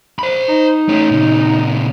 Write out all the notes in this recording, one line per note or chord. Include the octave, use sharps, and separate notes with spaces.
C5 B5
D#4
A3 C#4
A#2 C#3